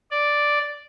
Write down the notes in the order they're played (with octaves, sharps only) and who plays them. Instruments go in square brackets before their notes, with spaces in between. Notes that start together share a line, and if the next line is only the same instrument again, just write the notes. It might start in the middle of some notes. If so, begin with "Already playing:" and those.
[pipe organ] D5